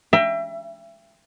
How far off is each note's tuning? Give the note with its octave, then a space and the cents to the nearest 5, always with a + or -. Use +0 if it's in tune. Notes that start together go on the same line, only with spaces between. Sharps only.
E5 +30 G5 +25 A#5 +35